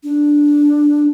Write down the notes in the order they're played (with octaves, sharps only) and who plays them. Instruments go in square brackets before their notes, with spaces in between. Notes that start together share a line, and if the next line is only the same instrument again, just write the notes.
[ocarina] D4